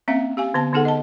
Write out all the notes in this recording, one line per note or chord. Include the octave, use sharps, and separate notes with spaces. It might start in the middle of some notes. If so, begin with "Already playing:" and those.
A#3 C4 C#4 E5 F5
G4 F5 G#5
D3 B3 A5
D3 B3 D#4 G#4 A4 F#5
D#5 A5